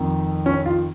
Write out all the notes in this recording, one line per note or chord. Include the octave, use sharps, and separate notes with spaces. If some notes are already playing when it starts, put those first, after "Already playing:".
Already playing: F2 D#3
C#4
F4